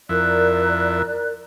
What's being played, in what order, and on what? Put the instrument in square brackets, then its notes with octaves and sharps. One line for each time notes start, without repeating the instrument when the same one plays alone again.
[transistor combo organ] F2 E4 [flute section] A#4 D5 F#6